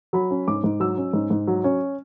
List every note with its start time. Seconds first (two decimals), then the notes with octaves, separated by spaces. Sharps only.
0.13 F#3 B5
0.31 C#4
0.48 G#2 D6
0.64 G#2
0.80 F#3 E6
0.97 C#4
1.13 G#2
1.30 G#2
1.47 F#3
1.64 C#4